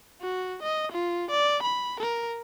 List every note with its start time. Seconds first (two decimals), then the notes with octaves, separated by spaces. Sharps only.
0.22 F#4
0.62 D#5
0.92 F4
1.31 D5
1.63 B5
2.00 A#4